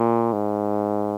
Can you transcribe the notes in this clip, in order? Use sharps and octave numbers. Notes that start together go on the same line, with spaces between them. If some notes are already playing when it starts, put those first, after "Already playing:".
Already playing: A#2
G#2